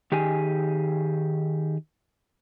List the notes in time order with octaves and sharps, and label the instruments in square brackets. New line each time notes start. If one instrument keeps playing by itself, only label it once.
[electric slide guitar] D#3 G4 G#4 G#5